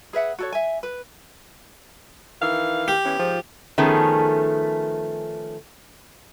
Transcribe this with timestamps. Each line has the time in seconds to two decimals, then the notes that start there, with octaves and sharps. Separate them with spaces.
0.13 G#4 B4 E5 F#5
0.39 F#4 A4 C#5
0.52 E5 G#5
0.83 B4
2.42 D#3 E3 F5
2.88 G4
3.05 E3 B3 C#4
3.19 G#2 F3
3.78 D#3 F3 A3 B3 C#4 G#4